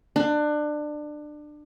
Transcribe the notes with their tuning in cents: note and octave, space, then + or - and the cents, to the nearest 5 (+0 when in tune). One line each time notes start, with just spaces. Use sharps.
D4 +25